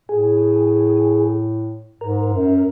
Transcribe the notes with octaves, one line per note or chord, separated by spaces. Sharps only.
A2 G#4
G#2 A#4
F#2